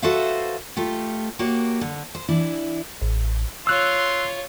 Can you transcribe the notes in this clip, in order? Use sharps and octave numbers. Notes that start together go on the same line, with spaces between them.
F#4 A4 B4 C5 E5 F5
A3 F4 G4
A#3 F#4 G4 C#5
D3
C5
E3 D4 E4
A1
F4 C#5 C6 E6 F#6